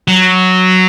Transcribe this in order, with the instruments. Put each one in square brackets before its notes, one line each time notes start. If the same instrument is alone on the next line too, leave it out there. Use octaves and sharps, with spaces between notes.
[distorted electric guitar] F#3